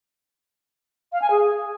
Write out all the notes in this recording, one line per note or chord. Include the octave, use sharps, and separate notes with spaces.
F5
G#5
G#4